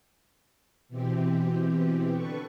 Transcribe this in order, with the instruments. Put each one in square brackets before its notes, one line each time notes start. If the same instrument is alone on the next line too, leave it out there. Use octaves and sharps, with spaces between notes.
[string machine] B2 E3 C4 G4
D3 A4 B4 C#6